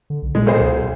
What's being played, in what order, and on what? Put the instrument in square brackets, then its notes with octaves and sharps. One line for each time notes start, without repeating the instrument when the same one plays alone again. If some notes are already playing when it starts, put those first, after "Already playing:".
[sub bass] D3
B1
[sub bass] A#2 [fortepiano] G#3
[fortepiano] B1 G#4 C5
[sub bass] C#2